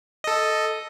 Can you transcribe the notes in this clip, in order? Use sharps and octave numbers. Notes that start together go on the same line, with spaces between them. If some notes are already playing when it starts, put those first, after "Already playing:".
A4 D#5